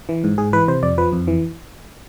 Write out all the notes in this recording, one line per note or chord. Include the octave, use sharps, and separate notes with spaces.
E3
G#2
G#2 G#4
E3 B4
C3 C5
F2 D5
F3 B4
F2
E3